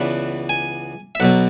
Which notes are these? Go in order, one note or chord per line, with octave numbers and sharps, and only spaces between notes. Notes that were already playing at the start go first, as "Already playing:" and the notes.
Already playing: C#2 C#3 E3 B3 D4 F#5
G#5
E5
B1 B2 F#3 F#5